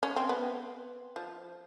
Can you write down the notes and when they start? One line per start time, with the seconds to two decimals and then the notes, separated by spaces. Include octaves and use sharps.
0.03 C#4
0.16 C4
0.29 B3
1.16 F3